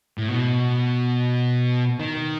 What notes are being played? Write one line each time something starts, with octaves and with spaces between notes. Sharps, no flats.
A2
B2
D#3